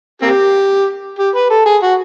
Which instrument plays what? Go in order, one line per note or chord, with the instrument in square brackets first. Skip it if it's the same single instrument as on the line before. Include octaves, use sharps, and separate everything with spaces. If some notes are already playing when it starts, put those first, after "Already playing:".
[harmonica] A#3 C4 G4
G4
B4
A4
G#4
F#4